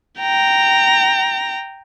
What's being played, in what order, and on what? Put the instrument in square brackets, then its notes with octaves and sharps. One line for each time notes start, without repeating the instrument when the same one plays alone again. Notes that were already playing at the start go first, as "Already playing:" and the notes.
[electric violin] G5 A#5